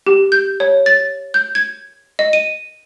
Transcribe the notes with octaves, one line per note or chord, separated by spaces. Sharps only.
G4
G6
C#5
A6
G6
G#6
D#5
D#7